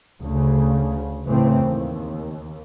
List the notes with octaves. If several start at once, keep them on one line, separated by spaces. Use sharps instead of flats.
D2 C#3
A2 C#3 E3 A3 C4
D#2